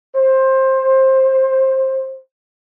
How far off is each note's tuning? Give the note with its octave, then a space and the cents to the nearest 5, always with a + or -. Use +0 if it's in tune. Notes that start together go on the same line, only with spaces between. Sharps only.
C5 +20